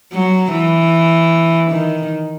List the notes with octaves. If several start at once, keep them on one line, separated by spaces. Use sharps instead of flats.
F#3
E3
D#3